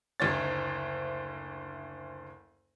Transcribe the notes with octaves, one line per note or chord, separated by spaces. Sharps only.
F#1 D2 D#4 C#5 A6